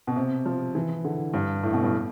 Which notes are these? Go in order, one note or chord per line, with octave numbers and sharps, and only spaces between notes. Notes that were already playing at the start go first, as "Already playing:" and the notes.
B2
C3
F3
E3
D3
G2
A2
B2
G2